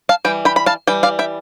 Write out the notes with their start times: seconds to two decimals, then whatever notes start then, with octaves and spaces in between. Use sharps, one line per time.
0.09 F5 A5
0.25 E3 G3 G5
0.45 G5 B5
0.56 B5
0.66 F5 A5
0.87 E3 G3 G5
1.03 D5 F5
1.19 E5 G5